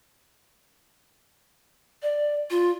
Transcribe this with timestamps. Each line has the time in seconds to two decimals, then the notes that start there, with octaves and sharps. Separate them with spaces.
2.03 D5
2.50 F4